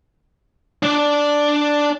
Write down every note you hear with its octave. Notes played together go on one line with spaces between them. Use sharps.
D4 D5